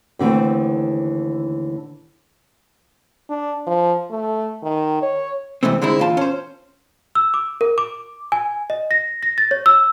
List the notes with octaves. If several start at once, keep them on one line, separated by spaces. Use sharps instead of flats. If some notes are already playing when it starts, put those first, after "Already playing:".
D#2 D3 E3 A3 C4
D4
F3
A3
D#3
C#5
C3 E3 G#3 A3 C4
D3 G#3 C4 D#4 E4
A#2 E3 F4 A5
C#4 C5
E6
D6
A#4
D6
G#5
D#5
A#6
A#6
A6
C#5
E6